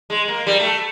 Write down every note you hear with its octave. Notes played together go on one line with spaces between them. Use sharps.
G#3
A#3
G3
A3